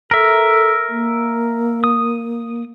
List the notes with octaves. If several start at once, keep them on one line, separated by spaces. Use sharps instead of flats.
A4 A#4 E5
A#3
D#6